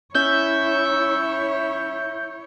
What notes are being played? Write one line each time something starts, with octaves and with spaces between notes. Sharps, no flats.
C#4 E4 C#5 E5 G6